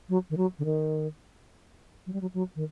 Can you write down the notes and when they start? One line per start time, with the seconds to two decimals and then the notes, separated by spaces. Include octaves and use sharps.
0.09 F#3
0.30 D#3
0.37 F#3
0.59 D3
0.65 D#3
2.07 F#3
2.13 G3
2.21 F#3
2.34 F#3
2.56 D#3